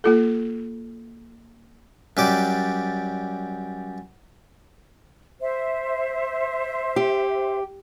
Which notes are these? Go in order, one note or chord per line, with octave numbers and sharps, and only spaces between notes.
A#3 F4 A4
F#2 G3 D5
C5 E5
G4